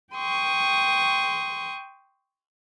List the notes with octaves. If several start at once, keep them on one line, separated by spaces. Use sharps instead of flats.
G5 C6 C#6 D#6